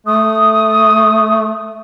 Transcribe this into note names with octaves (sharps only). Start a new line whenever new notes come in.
A3 D#6